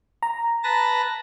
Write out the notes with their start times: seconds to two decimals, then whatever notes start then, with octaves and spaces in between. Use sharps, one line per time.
0.23 A#5
0.63 B4 A5 A#6